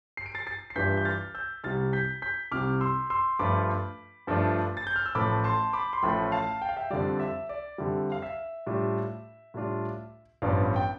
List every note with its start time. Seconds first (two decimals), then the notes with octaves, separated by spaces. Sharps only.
0.17 C7
0.26 D7
0.35 A6 C7
0.47 A6 C7
0.70 C7
0.76 G2 E3 G3 D4 F4 G6 B6
0.97 G6
1.05 F6 A6
1.35 E6 G6
1.64 C2 C3 G3 F6 A6
1.93 G6 B6
2.22 G6 B6
2.51 C2 C3 G3 D6 F6
2.81 C6 E6
3.10 C6 E6
3.39 G2 F3 A3 D4 F4 B5 D6
4.27 G2 F3 A3 D4 F4
4.77 A6
4.87 G6
4.96 F6
5.06 E6
5.15 A1 A2 F3 A3 B5 D6
5.44 A5 C6
5.73 B5 D6
5.93 C6
6.03 A1 A2 F3 A3 G5 B5
6.32 F5 A5
6.62 G5
6.69 F5
6.77 E5 G5
6.90 F2 D3 G3 D5 F5
7.20 E5
7.49 D5
7.78 F2 D3 G3 E5
8.12 F5
8.22 E5
8.67 A2 G3 D4 F4
9.54 A2 G3 D4 F4
10.42 A1 G2 F3 B3 D5 F5
10.76 G5